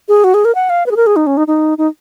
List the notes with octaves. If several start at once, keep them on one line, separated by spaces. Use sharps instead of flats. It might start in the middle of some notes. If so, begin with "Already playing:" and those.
G#4
F#4
G#4
A#4
F#5
F5
B4
G#4
A#4
G#4
D#4
C#4
D#4
D#4
D#4